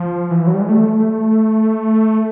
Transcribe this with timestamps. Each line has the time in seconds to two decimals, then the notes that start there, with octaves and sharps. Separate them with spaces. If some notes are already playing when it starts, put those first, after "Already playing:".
Already playing: F3
0.31 E3
0.47 F#3
0.54 G3
0.61 G#3
0.69 A3